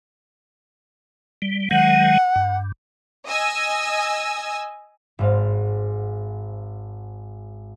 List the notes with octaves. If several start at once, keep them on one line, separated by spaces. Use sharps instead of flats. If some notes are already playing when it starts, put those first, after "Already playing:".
G3
D#3 F#3 G#3 F#5
G2
D#5 G#5 E6
G#1 G#2 F5